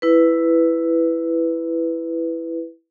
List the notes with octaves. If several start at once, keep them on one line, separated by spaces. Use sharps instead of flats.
E4 B4